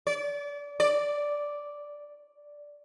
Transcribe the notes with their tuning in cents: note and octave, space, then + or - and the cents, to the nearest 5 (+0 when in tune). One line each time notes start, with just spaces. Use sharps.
D5 -30
D5 -5